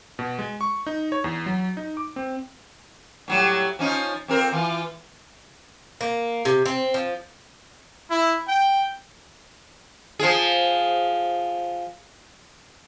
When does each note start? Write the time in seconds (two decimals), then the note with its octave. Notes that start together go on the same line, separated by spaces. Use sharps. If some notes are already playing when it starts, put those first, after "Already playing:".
0.19 B2
0.39 G#3
0.61 C#6
0.87 D#4
1.12 C#5
1.24 E2
1.46 F#3
1.77 D#4
1.97 D6
2.16 C4
3.28 A2 F#3 G3
3.79 F3 C#4 D#4
4.28 F2 C4 A#4
4.53 E3 F4
6.01 A#3
6.45 C3
6.66 C4
6.94 F3
8.10 E4
8.48 G5
10.19 F3 G#4